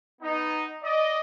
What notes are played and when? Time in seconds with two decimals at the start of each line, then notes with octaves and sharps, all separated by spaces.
0.22 B3 D#4
0.83 D5 D#5